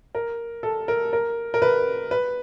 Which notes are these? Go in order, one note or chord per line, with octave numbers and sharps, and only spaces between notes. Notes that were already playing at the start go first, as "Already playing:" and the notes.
A#4
A4
A#4
A#4
A#4
B4
B4